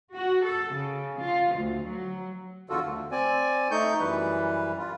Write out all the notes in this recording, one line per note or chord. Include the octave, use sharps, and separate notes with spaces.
F#4
A4
C#3
F4
D2
F#3
E2 D3 F4 F#4 A4
D2
C4 D5 G#5
A3 D#4 C#6 G6
F#2 E3 G3 B4
G3 F4